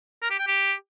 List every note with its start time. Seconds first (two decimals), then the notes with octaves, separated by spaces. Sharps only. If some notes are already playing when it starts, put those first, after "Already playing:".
0.22 A#4
0.31 G4
0.39 G5
0.47 G4